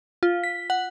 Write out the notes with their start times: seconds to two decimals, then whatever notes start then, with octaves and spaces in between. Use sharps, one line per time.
0.23 F4
0.44 B6
0.70 F#5